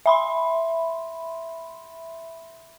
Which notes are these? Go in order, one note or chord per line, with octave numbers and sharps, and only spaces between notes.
E5 B5 C6